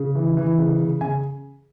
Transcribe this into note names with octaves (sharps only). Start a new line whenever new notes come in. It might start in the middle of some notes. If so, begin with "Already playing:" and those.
Already playing: C#3
E3
E3
C#3
C#3
C#3 G#5